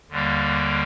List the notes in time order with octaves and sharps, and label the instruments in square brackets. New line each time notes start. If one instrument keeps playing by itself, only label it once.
[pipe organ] D#2 D3 G3 A#3